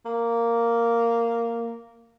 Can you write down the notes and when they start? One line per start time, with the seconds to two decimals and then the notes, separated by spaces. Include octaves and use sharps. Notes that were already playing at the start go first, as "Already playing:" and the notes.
0.05 A#3